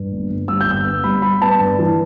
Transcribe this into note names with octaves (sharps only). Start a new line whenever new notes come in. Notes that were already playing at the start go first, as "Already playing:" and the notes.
Already playing: G2
G1
G1
G3 E6
G6
G1 E6
B3
G3 B5
G3 B5
B3 A5
G2
E3